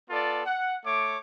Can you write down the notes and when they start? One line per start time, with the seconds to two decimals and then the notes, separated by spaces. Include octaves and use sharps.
0.10 B3 F4 A4 D5
0.46 F#5
0.86 A3 C#5 D6